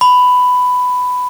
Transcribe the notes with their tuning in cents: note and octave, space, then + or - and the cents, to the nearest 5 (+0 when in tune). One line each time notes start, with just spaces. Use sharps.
B5 +10